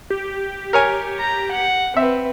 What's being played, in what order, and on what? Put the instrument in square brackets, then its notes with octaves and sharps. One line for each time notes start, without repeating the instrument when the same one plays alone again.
[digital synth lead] G4
[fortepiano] A#4 C#5 G#5
[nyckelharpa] A#5
F#5
[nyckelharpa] C4 B4 [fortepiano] E5